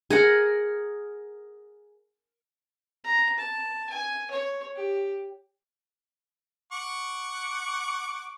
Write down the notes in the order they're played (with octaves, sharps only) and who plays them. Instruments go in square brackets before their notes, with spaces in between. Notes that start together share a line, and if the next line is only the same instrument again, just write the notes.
[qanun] G#4 A#4 F#5
[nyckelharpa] A#5
A5
G#5
C#5
G4
[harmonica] F#5 C#6 D6